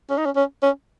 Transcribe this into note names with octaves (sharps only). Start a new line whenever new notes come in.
C#4
D#4
C#4
C#4
C#4